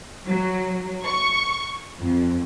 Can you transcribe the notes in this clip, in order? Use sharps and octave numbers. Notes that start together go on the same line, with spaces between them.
F#3
C#6
F2